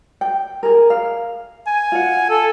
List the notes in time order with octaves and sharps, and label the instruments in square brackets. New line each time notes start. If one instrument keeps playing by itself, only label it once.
[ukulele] G5
G#4 A#4
F5
[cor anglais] G#5
[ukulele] F4 F#5
[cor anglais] A4